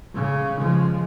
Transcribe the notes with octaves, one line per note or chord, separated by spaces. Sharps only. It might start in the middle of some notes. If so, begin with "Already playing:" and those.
C#3
F3 G#3